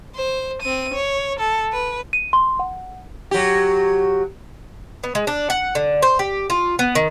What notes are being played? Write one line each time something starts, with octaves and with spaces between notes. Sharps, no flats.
C5
C4 D#7
C#5
A4
B4
D#7
C6
F#5
F#3 G4
B3
G#3
D4
F#5
D3
C5
G4
F4
B3
D#3